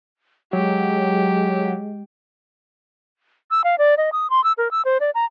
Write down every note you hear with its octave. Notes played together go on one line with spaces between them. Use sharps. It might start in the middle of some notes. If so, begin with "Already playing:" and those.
F#3 G#3 G4
E6
F5
D5
D#5
D#6
C6
E6
A#4
E6
C5
D5
A#5